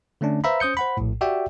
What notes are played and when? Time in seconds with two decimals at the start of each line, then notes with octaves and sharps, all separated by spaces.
0.21 D3 A3 C#4 D4
0.44 B4 C5 E5 F5 A#5 B5
0.60 C#4 C5 D#6 G6 C#7
0.77 C5 F#5 B5
0.97 A#1 A2
1.21 F#4 G4 D5 E5 F#5 G5